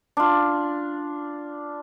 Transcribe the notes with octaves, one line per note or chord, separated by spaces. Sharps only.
D4 F4